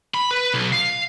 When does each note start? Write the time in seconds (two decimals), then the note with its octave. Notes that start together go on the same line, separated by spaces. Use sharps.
0.15 B5
0.31 B4
0.54 B1
0.73 F5